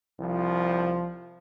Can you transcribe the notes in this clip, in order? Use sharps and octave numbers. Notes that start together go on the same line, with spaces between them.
C2 F3